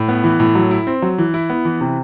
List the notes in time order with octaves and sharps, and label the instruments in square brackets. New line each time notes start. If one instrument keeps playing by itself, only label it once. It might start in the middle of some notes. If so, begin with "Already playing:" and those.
Already playing: [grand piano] A2
B3
E3
A2
F#3
E4
C4
F#3
E3
E4
B3
E3
C3